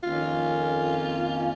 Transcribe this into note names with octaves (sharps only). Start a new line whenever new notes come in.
F2 D#3 A#3 C#4 F4